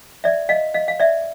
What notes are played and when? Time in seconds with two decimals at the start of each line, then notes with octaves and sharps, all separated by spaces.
0.24 D5 E5
0.49 D#5 F5
0.74 D#5 F5
0.88 F5
1.00 D5 E5